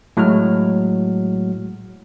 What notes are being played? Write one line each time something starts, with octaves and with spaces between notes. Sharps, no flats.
A2 F#3 G#3 F#4 F6